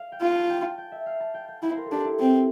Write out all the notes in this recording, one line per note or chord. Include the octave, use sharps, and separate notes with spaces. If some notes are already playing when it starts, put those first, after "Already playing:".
Already playing: F5
G5
F4
A5
G5
A5
G5
E5
F5
A5
G5
G5
E4 G5
C5
A#4
A4
D4 G4
E4
C4